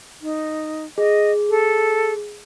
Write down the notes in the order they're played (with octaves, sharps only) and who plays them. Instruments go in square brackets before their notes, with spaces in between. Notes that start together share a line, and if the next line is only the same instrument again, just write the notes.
[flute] D#4
[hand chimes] G#4 [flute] D#5
[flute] A4